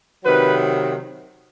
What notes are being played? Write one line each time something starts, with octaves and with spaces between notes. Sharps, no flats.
C3 D#3 F#3 B4